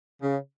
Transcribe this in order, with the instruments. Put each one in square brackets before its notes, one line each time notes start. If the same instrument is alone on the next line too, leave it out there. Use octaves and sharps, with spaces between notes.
[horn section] C#3